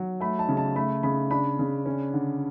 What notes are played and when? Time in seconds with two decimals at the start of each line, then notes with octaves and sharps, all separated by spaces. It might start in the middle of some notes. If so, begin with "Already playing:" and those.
Already playing: F#3
0.20 A3 B5
0.39 A5
0.49 C#3
0.57 A5
0.76 A3 B5
1.03 C#3 B5
1.31 D4 B5
1.59 C#3
1.86 C#4
2.14 D3